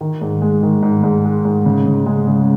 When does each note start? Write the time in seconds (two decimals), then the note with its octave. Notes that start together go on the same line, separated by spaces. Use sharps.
0.01 D#3
0.21 G#2
0.42 G#3
0.63 D#3
0.82 G#2
1.03 G#2
1.24 G#3
1.45 G#2
1.65 C#3
1.86 C#3
2.06 G#3
2.27 C#3